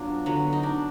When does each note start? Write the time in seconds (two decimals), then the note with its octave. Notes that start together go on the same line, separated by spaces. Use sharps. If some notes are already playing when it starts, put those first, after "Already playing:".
Already playing: F#3 B3 D4 F4
0.26 D3 F#3 B3
0.53 D#4
0.63 D4